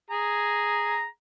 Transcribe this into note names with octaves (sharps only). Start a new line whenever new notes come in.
G#4 A#5